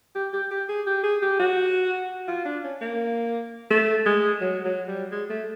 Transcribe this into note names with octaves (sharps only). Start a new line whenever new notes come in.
G4
G4
G4
G#4
G4
G#4
G4
F#4
F4
D4
C#4
A#3
A3
G#3
F#3
F#3
G3
G#3
A3